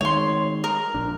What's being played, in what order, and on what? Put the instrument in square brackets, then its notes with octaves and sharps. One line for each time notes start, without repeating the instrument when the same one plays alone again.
[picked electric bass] D#3 G#3 [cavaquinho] C#5 C6
[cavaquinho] A#4
[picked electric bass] A#1 D4